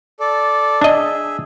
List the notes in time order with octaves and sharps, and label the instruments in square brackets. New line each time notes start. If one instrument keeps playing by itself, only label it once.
[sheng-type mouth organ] A4 D5
[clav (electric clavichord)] D4 D#5 [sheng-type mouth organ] G#4 E5